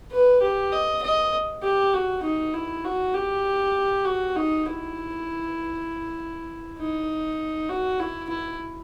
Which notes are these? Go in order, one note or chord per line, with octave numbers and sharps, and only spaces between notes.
B4
G4
D#5
D#5
G4
F#4
D#4
E4
F#4
G4
F#4
D#4
E4
D#4
F#4
E4
E4